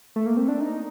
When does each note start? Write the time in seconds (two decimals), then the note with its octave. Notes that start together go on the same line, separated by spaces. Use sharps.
0.16 A3
0.26 A#3
0.37 C4
0.48 D4
0.60 D#4